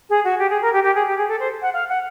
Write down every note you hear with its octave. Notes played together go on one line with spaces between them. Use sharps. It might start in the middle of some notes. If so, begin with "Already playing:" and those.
G#4
F#4
G4
G#4
A#4
G4
G4
G#4
G4
G#4
A4
C5
F#5
F5
F#5